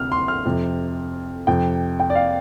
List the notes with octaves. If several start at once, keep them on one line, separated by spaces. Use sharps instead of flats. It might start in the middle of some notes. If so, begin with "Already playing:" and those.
Already playing: D2 C3 F6
C6
F6
F2 C3
F2 C3 G5
G5
D5
F5